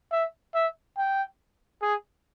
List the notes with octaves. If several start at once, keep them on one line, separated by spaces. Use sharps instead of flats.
E5
E5
G5
G#4